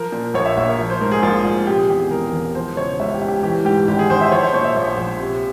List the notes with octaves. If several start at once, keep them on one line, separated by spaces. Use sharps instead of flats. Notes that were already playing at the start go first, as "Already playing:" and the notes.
Already playing: F3 A#4
A#2
A#1 C#5
E5
A#1 E5
A#4
F3
C5
G#2 A#4
G#4
A#1 F4
A#1
C3 G4
G#4
E2 G4
G#4
E1 A#4
E1
F3 C5
C#3 C#5
C#2 E5
G4
C#2
G4
E3 G4
G#2 G4
G#1 G4
G#4
G#1 C5
E5
F3 C#5
C5
A#2 C#5
E5
A#1
A#1
C3